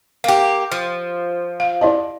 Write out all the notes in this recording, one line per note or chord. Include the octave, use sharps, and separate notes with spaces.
A#3 G4 F5 G5
F3
F5
E4 D5 D#5 A5